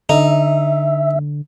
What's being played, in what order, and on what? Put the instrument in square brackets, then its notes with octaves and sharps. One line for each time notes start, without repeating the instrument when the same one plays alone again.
[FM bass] D3 [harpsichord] D#4 [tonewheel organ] E5